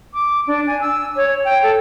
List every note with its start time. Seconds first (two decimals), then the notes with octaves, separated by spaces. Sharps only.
0.14 D6
0.47 D4
0.67 G#5
0.81 E6
1.16 C#5
1.44 G5
1.63 A4